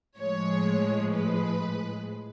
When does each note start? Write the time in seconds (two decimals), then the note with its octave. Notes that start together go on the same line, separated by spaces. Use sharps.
0.18 A2 F3 G#3 C#5
1.14 B4